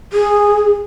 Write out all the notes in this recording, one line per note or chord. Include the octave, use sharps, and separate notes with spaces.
G#4